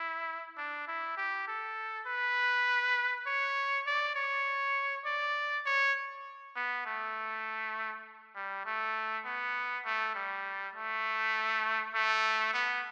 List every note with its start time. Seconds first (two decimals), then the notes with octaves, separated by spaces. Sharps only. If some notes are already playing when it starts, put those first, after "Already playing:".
Already playing: E4
0.57 D4
0.88 E4
1.17 G4
1.48 A4
2.07 B4
3.27 C#5
3.87 D5
4.16 C#5
5.06 D5
5.66 C#5
6.56 B3
6.86 A3
8.36 G3
8.66 A3
9.26 B3
9.85 A3
10.15 G3
10.75 A3
11.94 A3
12.54 B3